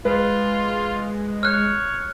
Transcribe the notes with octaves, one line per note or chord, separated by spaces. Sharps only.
G#3 F4 B4
C#5 F6 F#6